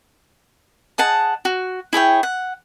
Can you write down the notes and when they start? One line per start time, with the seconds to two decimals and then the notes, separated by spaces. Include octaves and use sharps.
0.98 G#4 D#5 F#5 A5
1.45 F#4
1.93 E4 G#4 C#5 G5
2.23 F#5